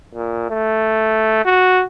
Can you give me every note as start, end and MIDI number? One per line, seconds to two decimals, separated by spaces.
0.15 0.47 46
0.50 1.44 57
1.45 1.83 66